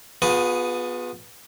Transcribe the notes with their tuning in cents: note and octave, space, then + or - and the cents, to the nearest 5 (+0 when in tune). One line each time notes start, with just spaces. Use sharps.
B3 +0 F4 +40 G#4 +0